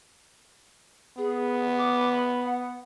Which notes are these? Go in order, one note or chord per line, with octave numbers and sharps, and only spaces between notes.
B3 G#4
D6
B5
F#5